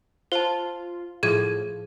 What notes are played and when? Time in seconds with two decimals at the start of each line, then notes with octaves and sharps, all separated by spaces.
0.32 F4 C5 A5
1.23 A2 F3 G#4 G#6 D#7